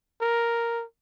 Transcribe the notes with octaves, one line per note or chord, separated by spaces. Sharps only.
A#4